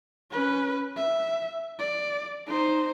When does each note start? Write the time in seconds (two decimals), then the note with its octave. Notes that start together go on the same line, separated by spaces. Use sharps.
0.30 C#4 B4
0.96 E5
1.79 D5
2.47 D#4 C5